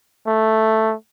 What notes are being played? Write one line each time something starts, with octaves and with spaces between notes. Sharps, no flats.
A3